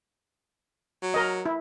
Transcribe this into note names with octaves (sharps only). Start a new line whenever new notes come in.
F#3
A#4 D#5
E4